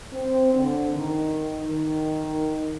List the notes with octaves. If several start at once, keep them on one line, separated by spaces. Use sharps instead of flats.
C4
D3
D#3
D#3